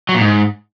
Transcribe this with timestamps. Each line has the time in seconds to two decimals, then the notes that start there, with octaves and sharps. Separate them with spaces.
0.09 F#3
0.15 A#2
0.21 G#2